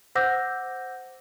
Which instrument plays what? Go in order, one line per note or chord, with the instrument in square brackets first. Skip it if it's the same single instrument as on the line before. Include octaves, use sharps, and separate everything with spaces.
[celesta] C5 F#5 D6 E6 G6 A#6